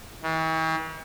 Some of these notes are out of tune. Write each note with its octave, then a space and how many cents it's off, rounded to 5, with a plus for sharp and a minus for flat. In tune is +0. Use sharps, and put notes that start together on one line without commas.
E3 -45